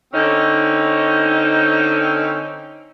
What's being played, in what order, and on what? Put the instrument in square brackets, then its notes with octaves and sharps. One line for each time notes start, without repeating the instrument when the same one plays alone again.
[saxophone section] D3 C4 C#4 D#4